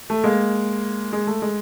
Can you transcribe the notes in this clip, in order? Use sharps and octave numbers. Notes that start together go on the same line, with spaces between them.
A3
G#3 A#3
G#3
A3
G#3